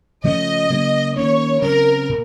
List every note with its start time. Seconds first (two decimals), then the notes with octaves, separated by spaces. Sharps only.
0.24 C#3 F3 A3 C#4 D#5
0.70 C#3 F#3 A#3
1.16 D#3 A#3 C#4 C#5
1.62 C#3 F#3 C4 A#4
2.09 A#2